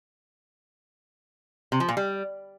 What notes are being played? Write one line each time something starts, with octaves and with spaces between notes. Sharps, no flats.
C3
F3
A#2
G3